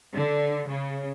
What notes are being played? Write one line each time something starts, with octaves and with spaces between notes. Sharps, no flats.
D3
C#3